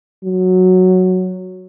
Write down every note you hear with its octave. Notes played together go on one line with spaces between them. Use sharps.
F#3